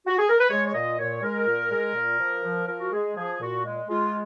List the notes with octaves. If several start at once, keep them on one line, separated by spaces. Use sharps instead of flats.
F#4
G#4
A#4
B4
G#3 C#5
C#5
A#2 D#5
A#2 C#5
G#3 A#4
A#2
G#3
A#2
F3
F3
F3 A#4
F#4
G#3 G#4
F3 G#4
A#2 F#4
G#3
G#3 F4